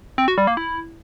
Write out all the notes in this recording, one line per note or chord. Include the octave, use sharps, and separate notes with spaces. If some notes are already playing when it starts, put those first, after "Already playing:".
C4
F#4
G3
A#3
E4